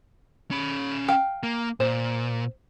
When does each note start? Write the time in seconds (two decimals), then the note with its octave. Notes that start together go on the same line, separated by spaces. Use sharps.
0.51 C#4 B5
1.08 F5 G5
1.43 A#3
1.80 A#2 C5